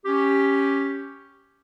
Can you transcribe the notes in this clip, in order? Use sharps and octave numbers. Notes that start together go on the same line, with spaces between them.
C#4 G4